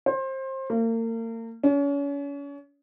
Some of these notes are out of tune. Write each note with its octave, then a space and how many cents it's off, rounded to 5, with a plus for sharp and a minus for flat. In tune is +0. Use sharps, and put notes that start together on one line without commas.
C5 +25
A#3 -40
C#4 +35